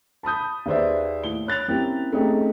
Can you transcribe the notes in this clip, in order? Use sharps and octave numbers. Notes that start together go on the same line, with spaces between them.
A5 B5 D#6 G6
D#2 G#4 B4 C5 D5 E5
A2 G7
C#5 F#6 A6 F7
A#3 C4 C#4 E4 G4
A3 C4 C#4 D#4 G4 G#4